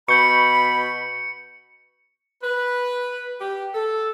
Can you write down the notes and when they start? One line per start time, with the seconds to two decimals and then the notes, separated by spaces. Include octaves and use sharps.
0.09 B2 B5 C#6 G6 C#7
2.43 B4
3.41 G4
3.75 A4